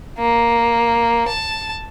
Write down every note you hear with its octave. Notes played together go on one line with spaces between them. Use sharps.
A#3
A5